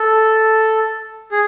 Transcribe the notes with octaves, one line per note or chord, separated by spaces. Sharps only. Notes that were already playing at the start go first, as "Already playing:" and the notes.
Already playing: A4
G#4